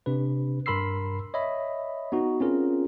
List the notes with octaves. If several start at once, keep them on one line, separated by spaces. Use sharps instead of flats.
C3 D4 B4
G2 A#4 B5 C6 E6 C7
C#5 D#5 E5 B5
B3 D#4 F#4
C4 C#4 F4 G#4 A#4